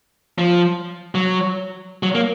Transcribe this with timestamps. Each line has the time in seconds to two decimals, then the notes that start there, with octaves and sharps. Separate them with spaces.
0.38 F3
1.15 F#3
2.03 F#3
2.15 A#3